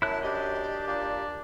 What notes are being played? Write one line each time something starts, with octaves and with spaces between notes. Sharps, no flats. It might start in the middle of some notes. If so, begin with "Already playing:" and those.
F#2 E4 A5 F#6
D4 G4 D#5
A#2 D4